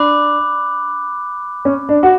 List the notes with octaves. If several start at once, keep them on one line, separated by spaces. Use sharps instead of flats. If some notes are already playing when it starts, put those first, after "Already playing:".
Already playing: D4 B5 D6 F#6
C#4
D4
F#4